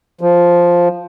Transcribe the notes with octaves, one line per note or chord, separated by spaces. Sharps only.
F3